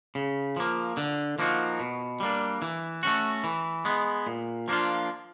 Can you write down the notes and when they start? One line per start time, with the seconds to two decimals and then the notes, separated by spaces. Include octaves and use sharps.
0.15 C#3
0.57 F3 A#3
0.97 D3
1.39 F3 A#3 D#4 F#4
1.80 B2
2.20 G3 A#3 D4
2.62 E3
3.03 A3 C#4 F#4
3.44 E3
3.85 G#3 B3
4.27 A#2
4.68 F3 A#3 D4 F4